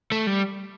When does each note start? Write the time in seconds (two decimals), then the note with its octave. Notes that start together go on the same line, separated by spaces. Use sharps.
0.12 A3
0.27 G3